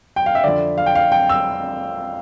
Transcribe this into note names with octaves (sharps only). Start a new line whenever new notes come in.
G5
F5
E5
F2 D3 D5
F5
G5
F5
G5
E6